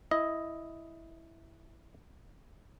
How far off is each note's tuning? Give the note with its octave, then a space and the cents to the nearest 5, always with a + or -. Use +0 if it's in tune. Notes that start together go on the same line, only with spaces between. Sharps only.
E4 +0 D#5 +5